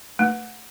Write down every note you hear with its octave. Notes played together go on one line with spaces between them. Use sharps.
A3